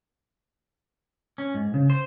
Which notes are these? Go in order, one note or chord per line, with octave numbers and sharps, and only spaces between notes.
C#4
G#2
C#3
C5